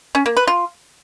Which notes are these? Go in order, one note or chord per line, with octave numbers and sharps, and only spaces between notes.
C#4
A#3
B4
F4